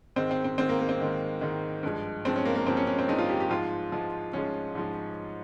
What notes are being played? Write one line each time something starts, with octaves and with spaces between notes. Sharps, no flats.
G#2 D#3 G#3 C4
C4
C4
G#2 D#3 G#3 C4
A#3
A#3
C4
G#2 D#3 G#3
G#2 D#3 G#3
G2 F3 G#3
G2 F3 G#3 C4
C#4
A#3
A#3
G2 F3 G#3 C4
C#4
C#4
C4
G2 F3 G#3 D#4
F4
G4
G4
G#2 F3 G#3 F4
G#2 F3 G#3
G#2 F3 G#3 C#4
G#2 F3 G#3